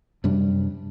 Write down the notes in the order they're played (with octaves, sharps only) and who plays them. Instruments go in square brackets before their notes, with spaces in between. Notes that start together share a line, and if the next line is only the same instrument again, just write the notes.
[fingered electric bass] F#2 C3 G3 D4